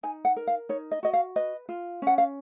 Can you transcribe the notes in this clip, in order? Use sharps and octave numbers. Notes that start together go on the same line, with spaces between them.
D#4 G#5
F#5
A#4
F5
D#4 C#5
D#5
F#4 D#5
F5
B4 D#5
F4
C#4 F#5
F5